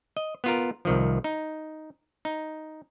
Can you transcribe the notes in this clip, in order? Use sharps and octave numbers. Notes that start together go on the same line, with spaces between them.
D#5
B3 F4 A#4
C2 D#3 F3
D#4
D#4